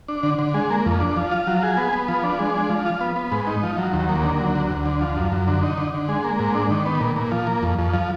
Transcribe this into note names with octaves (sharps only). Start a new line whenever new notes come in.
D4
D3
D3
G#3
A#3
F2
D4
F3
F4
F#3
G#4
B3
B3
F3
D4
G#3
D4
F3
F4
B3
B3
G#2
D#4
F3
F#3
D#2
A#3
D3
F#3
D2
D2
D3
F3
F#2
F#2
D3
D#4
D3
D3
G#3
A#3
G#2
D4
D#3
B3
A#2
A#2
F3
A#3
F2
F2
F3